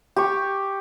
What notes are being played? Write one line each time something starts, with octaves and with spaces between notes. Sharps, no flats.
G4 C#6